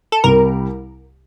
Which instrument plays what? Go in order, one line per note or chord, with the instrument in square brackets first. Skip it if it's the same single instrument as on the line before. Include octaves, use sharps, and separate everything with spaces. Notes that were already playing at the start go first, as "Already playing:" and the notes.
[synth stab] A4
[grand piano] C2 C3 G3 [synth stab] A#4